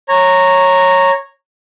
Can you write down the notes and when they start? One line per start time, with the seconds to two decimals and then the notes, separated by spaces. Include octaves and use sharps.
0.09 C#5 A#5